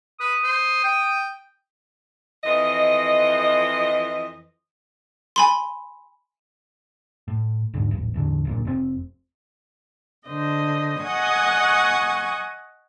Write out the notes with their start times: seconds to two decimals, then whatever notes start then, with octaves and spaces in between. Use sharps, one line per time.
0.20 B4 D#6
0.44 C5
0.84 G5
2.44 F2 E3 C5 D#5
5.36 G#5 B5 C6
7.28 A2
7.74 D#1 A#1 G#2 D3
7.91 D#1 A1
8.14 A1 E2 D3
8.45 D1 A#1 A#2
8.65 F1 C#3 C4
10.28 D3 C5 D#5
11.03 D#5 F#5 G#5 C#6 D#6